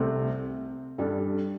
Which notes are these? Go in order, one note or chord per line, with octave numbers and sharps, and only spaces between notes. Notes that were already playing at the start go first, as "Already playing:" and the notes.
Already playing: C2 C3 A3 C4
G2 G3 D4 A4